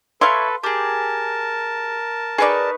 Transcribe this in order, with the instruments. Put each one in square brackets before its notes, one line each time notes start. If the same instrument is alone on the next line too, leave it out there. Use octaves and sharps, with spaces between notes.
[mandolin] E4 C#5 C#6 [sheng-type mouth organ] A4 B4 [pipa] F5 C6
[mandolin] G4 G#4 [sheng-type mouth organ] A#4 A5
[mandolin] D#4 B4 C#6 [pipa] G#4 D5